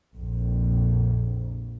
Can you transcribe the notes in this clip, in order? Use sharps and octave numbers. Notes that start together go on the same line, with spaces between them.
A#1 F2